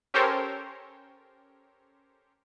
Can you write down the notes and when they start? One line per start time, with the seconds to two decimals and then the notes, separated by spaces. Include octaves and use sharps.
0.14 C#4 G4 A4 A#4 C5 C#5